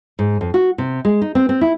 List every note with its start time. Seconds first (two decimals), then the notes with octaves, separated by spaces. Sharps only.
0.19 G#2
0.41 F2
0.54 F#4
0.78 C3
1.05 G#3
1.22 D#4
1.35 C4
1.49 C4
1.61 E4